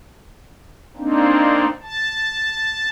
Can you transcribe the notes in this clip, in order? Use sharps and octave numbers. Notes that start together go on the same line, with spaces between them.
A#3 C4 D4 D#4
A5